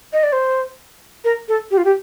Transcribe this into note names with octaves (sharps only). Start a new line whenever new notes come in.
D#5
D5
C5
A#4
A4
G4
F4
G4